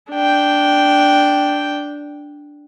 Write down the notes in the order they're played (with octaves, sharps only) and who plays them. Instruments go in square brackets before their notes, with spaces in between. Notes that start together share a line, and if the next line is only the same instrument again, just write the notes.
[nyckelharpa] D4 G5